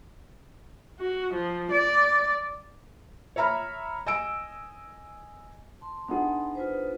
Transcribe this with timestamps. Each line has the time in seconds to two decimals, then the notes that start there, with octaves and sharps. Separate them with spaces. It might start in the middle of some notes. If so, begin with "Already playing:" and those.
1.00 F#4
1.33 F3
1.71 D5
3.36 C#5 E5 A#5 B5 F6
4.06 D#5 G#5 E6 D7
5.81 A5 C6
6.08 B3 D4 D#4 G#4 F#5
6.55 F4 B4 C5